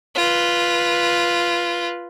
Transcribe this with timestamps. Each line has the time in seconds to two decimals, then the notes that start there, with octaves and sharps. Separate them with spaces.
0.15 F4 B4